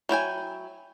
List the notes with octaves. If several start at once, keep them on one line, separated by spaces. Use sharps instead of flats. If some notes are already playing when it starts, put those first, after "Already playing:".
F#3 E4 G5 G#5